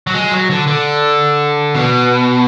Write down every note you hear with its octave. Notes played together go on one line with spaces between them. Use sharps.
F#3
G#3
F#3
D3
D3
B2